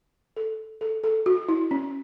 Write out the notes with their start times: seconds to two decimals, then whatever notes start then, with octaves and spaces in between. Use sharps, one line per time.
0.37 A4
0.81 A4
1.04 A4
1.26 F#4
1.49 E4
1.71 C#4